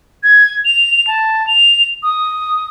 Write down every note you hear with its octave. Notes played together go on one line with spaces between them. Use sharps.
G#6
F7
A5
F7
D#6